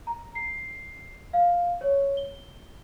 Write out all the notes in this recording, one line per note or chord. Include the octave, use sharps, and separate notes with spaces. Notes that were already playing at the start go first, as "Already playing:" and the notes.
A#5
C7
F5
C#5
G7